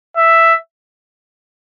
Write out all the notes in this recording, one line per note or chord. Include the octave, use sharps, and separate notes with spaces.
E5